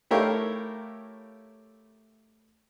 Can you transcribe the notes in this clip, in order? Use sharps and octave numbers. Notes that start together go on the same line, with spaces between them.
A3 E4 G4 A#4 C#5 F5